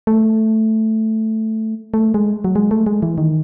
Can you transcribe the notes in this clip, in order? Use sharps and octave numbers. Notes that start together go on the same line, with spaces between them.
A3
A3
G#3
F#3
G#3
A3
G#3
E3
D#3